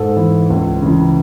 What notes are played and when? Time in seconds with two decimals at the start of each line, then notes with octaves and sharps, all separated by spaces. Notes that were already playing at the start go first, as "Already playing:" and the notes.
Already playing: G#2 A4
0.17 E3
0.50 C#2
0.82 C#3 E3